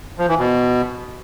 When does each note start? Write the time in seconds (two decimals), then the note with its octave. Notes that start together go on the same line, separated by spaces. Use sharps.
0.18 F3
0.29 E3
0.39 B2